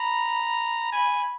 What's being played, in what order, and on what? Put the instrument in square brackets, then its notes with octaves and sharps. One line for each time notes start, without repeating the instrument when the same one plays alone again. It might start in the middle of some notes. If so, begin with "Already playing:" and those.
Already playing: [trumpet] A#5 [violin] B5
[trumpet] G#5 [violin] B5